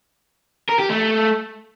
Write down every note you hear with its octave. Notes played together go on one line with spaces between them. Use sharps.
A#4
G4
A3